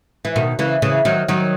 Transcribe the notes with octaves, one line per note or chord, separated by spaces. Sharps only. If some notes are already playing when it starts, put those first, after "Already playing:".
E3
B2 D#3
C#3 E3
C#3 E3
D#3 F#3
D#3 F#3